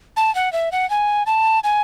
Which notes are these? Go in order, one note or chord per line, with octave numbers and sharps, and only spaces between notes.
A5
F#5
E5
F#5
G#5
A5
G#5